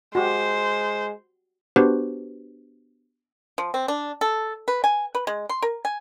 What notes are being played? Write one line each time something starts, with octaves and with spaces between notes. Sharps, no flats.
G#3 F#4 G4 C5
B3 D4 F#4 G4 B4 C5
F3
C4
D4
A4
B4
G#5
B4
G#3
C6
A#4
G#5